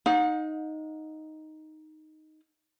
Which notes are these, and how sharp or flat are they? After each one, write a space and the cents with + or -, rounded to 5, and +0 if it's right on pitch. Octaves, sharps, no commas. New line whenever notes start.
D#4 +0 F#5 -45